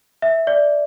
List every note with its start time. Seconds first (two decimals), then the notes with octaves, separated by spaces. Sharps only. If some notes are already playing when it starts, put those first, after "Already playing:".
0.22 E5
0.47 D5